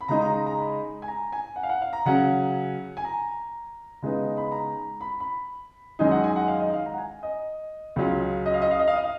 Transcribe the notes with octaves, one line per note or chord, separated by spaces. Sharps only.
B5
C#3 G#3 D#4 A#5
A#5
A#5
A#5
B5
G#5
A#5
G#5
F#5
F5
F#5
F5
A#5
C#3 F#3 C#4 F#5
G#5
A#5
C#3 G#3 B3 D#4
B5
A#5
B5
B5
F#2 D#3 G#3 D#4 G#5
F#5
G#5
F#5
F5
D#5
F5
A#5
F#5
G#5
D#5
C#2 C#3 F#3 C#4 F4
D#5
F5
D#5
F5
D#5
F5
D#5
F5